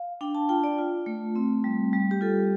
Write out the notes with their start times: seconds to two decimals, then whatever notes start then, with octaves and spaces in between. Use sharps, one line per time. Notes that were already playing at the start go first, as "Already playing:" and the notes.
Already playing: F5
0.21 D4 G5
0.35 A5
0.49 F4 G5
0.64 D5
0.78 F4
1.06 A3
1.35 C4
1.64 G3
1.93 G3
2.11 G4
2.21 F4 A4